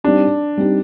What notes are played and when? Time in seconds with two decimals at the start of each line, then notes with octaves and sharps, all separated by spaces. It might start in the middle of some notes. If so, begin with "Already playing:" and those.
0.04 G3 C4 D4 D#4 G4
0.57 G3 C4 D#4 G4